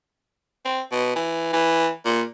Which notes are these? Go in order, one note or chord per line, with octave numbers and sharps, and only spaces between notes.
C4
B2
E3
E3
A#2